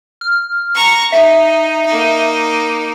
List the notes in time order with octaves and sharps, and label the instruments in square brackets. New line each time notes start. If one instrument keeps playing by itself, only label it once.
[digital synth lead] F6
[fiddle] A#5 C#6
[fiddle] D#4 [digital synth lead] E5
[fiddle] A#3 D#4